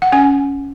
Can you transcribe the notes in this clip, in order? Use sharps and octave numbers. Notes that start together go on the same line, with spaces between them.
F#5
C#4 G#5